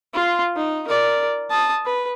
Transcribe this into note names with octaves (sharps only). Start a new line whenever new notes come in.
F4 C6
D#4
A#4 D5
A5 D#6
B4